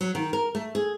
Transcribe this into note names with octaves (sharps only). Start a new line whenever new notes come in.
F#3
D#3
A#4
A3
G#4